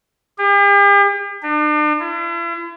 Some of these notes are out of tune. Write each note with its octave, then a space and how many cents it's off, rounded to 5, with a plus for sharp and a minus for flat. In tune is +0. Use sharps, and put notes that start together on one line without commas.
G4 +45
D4 +40
E4 +45